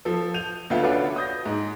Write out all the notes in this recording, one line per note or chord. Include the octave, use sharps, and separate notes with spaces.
F3 A4
G6 D#7 F7
D2 B3 F4 E5
C#4 D4 F4 F#4 A4 B4
D#6 G6 A#6
G#2